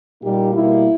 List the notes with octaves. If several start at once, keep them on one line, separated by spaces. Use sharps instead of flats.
A#2 G3 A#3 D#4 G4
B2 G3 A#3 E4